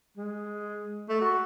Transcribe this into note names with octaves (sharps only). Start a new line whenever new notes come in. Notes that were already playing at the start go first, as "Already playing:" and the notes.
G#3
A3
F#4